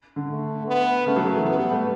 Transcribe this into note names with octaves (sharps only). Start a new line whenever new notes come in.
D3
A3
B3
C#3 A3
F#3
F#3
E3
B3
G3
A3